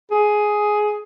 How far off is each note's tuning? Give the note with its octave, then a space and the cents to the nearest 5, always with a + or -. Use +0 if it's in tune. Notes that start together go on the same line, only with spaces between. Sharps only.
G#4 +10